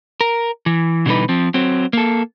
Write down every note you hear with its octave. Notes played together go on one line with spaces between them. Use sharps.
A#4
E3
B2 D3 E3 G3 D#4 B4
F3 C4
F#3 C4
A#3 A4